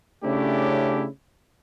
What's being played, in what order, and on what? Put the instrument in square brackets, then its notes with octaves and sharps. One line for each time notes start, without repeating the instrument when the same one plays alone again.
[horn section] C#3 A3 C#4 D4 E4 G4